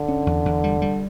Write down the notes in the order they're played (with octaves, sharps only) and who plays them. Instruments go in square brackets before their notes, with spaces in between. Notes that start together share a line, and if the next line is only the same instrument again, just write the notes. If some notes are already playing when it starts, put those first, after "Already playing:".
Already playing: [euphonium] D3
[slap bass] C#4
E2
E2
G3
G3